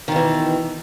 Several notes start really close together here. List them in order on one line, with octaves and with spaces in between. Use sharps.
D#3 B2 E3